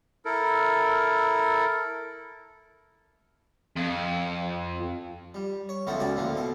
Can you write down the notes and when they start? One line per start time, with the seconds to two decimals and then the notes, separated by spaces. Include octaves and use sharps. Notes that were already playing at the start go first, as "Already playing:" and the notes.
0.25 E4 A4 A#4
3.77 F2
5.34 G3
5.69 C#5
5.87 C#2 E3 F3 B3 A4
6.00 C#2 F#4 D5 G#5
6.17 D2 A2 F3 A#3
6.36 B2 A4